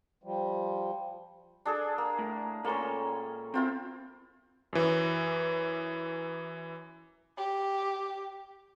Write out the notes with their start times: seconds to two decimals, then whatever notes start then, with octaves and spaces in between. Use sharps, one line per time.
0.24 F3 G3
1.65 D4 G#4 A4
1.98 A#3
2.19 A2
2.64 A#2 A#3 C#4 A4 C6
3.54 C4 E4 F4 C5
4.73 F#2 E3
7.37 G4